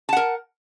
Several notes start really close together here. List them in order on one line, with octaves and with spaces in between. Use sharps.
A5 F#5 A#4